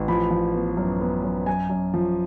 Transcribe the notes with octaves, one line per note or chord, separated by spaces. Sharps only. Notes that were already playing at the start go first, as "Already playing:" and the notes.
Already playing: A1
F3 B5
F3
B3
F#2
B3
F#2
F#2 G#5
F#2
F3